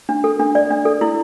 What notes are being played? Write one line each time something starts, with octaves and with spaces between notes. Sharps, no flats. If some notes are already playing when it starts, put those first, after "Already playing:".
D4
A4
D4
D5
D4
A4
E4